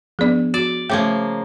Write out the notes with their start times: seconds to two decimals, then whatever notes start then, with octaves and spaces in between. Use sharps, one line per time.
0.19 F3 B3 D4 G#4 D5
0.54 F#4 D5
0.89 C#3 F3 A3 A#3 E5 D6 G#6